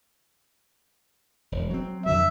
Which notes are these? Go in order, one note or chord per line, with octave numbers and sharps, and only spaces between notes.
E1
F#3 C4
F2 D3 F#3 E5